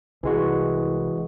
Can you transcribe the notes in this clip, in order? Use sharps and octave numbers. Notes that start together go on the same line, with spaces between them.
C2 E3 G#3 F#4